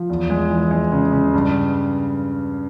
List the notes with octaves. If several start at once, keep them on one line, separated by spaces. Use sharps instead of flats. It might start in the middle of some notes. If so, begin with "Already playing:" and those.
Already playing: F3
E2
G#3
E3
G#3
C#3
C#3
G2